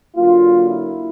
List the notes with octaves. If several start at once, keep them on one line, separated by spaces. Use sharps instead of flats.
D3 F#3 A#3 F4
E4